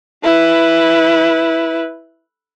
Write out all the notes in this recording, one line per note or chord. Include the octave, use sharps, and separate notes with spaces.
E4 B4